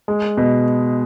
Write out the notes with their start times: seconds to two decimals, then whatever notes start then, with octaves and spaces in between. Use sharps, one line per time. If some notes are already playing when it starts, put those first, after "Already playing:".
0.08 G#3
0.37 B2